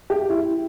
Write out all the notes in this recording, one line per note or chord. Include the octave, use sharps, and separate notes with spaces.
G4
E4